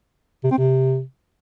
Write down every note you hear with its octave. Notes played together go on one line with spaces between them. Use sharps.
C3
C4
C3